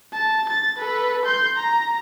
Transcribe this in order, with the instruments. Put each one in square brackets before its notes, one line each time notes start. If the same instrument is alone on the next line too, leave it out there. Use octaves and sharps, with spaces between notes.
[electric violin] A5
A6
A4 B4
C6 G6
A#5